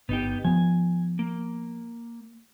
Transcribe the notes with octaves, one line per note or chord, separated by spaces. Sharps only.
G1 B3 D#4 G4
F3 B3 G#5
A#3